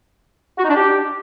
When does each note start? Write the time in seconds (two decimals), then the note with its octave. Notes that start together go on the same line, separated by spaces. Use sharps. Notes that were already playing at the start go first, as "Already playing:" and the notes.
0.58 F#4
0.64 D#4
0.70 D4
0.75 G4